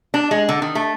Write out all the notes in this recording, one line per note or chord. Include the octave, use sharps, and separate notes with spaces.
D4
G#3
D3
D#3
A3